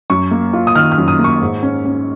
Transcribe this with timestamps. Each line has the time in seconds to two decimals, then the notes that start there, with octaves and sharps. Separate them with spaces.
0.10 F#2 C#6
0.31 A#3
0.53 F4
0.67 D#6
0.75 D#3 F6
0.92 F6
0.98 F#2
1.08 D#6
1.19 A#3
1.24 C#6
1.42 G#2
1.63 C#4
1.85 C#4